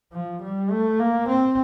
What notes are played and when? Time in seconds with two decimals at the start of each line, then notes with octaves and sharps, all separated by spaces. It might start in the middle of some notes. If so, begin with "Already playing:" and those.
0.13 F3
0.42 G3
0.71 A3
1.00 A#3
1.29 C4